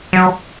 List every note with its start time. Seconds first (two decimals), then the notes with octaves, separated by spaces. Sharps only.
0.13 F#3